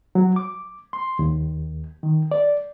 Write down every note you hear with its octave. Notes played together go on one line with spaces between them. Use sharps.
F#3
D6
C6
D#2
D#3
D5